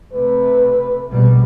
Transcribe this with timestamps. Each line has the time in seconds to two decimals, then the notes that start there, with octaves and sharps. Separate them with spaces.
0.13 C3 A3 B4
1.12 A#1 B2 G3